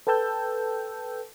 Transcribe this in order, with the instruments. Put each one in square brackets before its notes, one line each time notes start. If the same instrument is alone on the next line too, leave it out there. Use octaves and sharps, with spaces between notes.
[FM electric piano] A4 B4 G5 A5 E6 G6